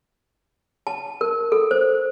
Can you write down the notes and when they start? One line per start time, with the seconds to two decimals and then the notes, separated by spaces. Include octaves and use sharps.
0.87 A5
1.21 A#4
1.52 A4
1.71 C5